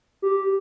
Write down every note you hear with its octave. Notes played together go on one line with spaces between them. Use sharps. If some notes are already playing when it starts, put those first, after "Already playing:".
G4